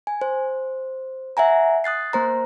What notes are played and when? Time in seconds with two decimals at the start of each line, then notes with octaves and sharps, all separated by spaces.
0.07 G#5
0.21 C5
1.37 E5 F#5 G#5 A#5
1.84 D#6 F#6 A6 C7
2.13 A#3 C5 A#5